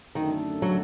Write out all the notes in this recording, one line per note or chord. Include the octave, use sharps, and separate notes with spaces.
F#2 D3 D#3 A3 D4 A4
F#3